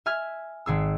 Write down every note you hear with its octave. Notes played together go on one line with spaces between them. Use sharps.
E5 G#5 F6 G#6
G#1 G#4 E6